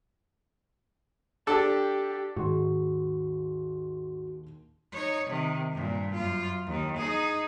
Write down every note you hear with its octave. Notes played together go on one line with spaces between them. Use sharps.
D4 G4 A4
D#2 G#2 F#4 G#4 C6
D#4 C#5
C3 D#3
G2 A#2
F#2 F4
D#2 D#3
D#4 G#4